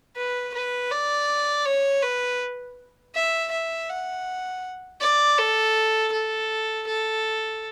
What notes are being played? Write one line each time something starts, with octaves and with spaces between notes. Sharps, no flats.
B4
B4
D5
C#5
B4
E5
E5
F#5
D5
A4
A4
A4